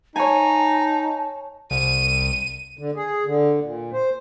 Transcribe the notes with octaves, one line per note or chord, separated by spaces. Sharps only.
D#4 C#5 G#5 A5
C2 D#7
D3
G#4
D3
A#2
C5